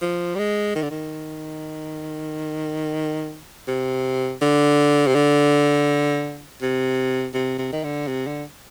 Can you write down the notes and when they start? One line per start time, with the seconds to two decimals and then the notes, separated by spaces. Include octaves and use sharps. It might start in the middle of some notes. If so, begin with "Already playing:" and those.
0.02 F3
0.35 G3
0.39 G#3
0.75 D#3
0.83 D3
0.91 D#3
3.68 C3
4.42 D3
5.07 C3
5.15 D3
6.62 C3
7.34 C3
7.59 C3
7.72 D#3
7.84 D3
8.07 C3
8.27 D3